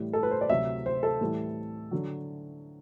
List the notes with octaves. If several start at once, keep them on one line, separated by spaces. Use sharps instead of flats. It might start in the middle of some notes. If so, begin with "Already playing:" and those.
Already playing: A2 E3 G3
A4
B4
C5
D5
D2 C3 F#3 E5
C5
A4
A2 E3 G3
D3 F#3